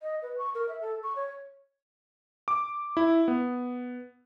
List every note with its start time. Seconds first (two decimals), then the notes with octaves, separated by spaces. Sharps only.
0.02 D#5
0.22 B4
0.38 C#6
0.55 A#4
0.69 E5
0.81 A4
1.03 C#6
1.16 C#5
2.48 D6
2.97 E4
3.28 B3